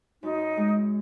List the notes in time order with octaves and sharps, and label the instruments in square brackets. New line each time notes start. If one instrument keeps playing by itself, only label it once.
[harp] F#2 [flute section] D#4
[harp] G#3